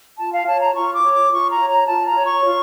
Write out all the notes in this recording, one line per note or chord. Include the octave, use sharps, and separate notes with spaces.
F4 A5
F5
C#5 A5
A#5
F4 C#6
D6
C#5
D6
F4 C#6
A#5
C#5
A#5
F4 A5
A#5
C#5
C#6
F4